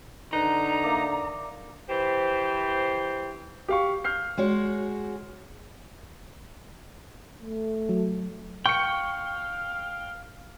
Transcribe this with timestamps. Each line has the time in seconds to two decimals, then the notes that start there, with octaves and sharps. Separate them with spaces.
0.33 D3 D#4 B4 A#5
0.83 A#3 D5 E5
1.89 E3 G4 C5
3.68 G4 F5 C#6
4.04 F6 G6 C7
4.38 G#3 F#4 C#5
7.43 A3
7.89 F#3
8.66 F5 G5 C#6 C#7